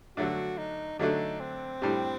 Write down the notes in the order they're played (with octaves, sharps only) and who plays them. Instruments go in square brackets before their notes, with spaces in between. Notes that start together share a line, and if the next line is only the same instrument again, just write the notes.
[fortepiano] D3 F#3 A3 D4 [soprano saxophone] F#4
[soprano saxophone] D#4
[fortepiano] D3 F#3 A3 D4 [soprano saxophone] D#4
[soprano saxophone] C4
[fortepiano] A2 G3 D4 G4